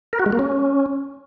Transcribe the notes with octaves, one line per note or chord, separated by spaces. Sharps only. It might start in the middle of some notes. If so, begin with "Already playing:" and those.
A#4
F#4
G#3
A#3
C#4